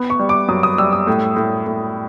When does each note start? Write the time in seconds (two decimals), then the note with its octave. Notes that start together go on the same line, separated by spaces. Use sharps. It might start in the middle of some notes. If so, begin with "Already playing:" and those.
Already playing: B3
0.10 C#6
0.19 G3
0.29 D6
0.48 F#2 D#6
0.63 D#6
0.78 G3 E6
0.93 D#6
1.07 A2
1.37 A2
1.67 A2